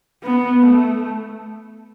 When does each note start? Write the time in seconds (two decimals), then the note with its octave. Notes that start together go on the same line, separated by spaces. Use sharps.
0.24 B3
0.66 A3